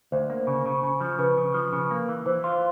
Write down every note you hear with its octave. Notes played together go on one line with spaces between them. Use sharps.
D2 C5
A#3
C#3
C#3
C#3
F3
C#3 B4
C#3
F3
C#3
A#3
E3
E3 C5
F4